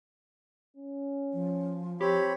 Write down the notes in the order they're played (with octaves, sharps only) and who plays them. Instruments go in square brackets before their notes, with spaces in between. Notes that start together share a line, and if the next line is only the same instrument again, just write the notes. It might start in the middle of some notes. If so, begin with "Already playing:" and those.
[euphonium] C#4
[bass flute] F3
[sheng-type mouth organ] C4 C#5 B5 [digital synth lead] G4